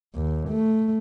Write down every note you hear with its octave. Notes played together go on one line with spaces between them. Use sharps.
D#2
A3